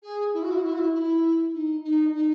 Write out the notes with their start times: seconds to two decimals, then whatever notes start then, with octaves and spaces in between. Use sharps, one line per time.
0.02 G#4
0.33 E4
0.42 F#4
0.51 E4
0.57 F#4
0.63 E4
0.72 F#4
0.78 E4
0.93 E4
1.53 D#4
1.83 D#4
2.14 D#4